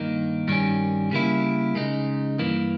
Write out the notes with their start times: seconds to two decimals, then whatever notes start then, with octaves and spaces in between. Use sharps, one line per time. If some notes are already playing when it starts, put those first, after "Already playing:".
Already playing: G2 D#3 A#3 D#4
0.48 G2 D#3 G3 C#4
1.11 C#3 G3 A#3 E4
1.75 C#3 G#3 D#4
2.39 G2 E3 A#3